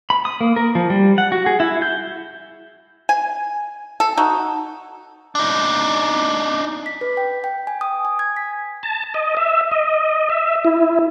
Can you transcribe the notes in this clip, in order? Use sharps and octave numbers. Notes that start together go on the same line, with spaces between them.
B5
D#6
A#3
A#4
F3
G3
F#5
F#4
G#4
E4
G6
G#5
A4
D#4 F#4
D4 D#4
B6
B4
G5
G5
G#5
D#6
G#5
G#6
B6
A5
D#5
E5
D#5
E5
E4